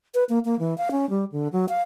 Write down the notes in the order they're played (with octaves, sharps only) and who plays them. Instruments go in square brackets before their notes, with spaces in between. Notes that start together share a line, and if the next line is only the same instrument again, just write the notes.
[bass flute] B4
A#3
A#3
E3
F5
C#4
G3
D3
F#3
F5